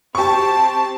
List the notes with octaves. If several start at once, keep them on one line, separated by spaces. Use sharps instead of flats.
C4 G4 A5 C#6